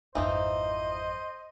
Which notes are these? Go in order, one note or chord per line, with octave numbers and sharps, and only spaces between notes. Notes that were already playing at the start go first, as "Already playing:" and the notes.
G#1 F2 E3 F3 D#4 C5 D#5